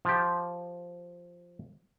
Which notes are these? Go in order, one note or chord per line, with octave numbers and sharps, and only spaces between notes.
F3 G4